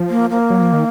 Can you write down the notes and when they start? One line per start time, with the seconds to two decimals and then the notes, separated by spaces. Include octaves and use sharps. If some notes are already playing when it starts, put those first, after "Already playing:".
Already playing: F3
0.10 A#3
0.30 A#3
0.50 F#3
0.61 F3
0.73 D#3